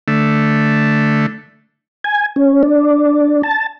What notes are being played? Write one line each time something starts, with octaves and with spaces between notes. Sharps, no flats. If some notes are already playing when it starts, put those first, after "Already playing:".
D3 A3
G#5
C#4
D4
A5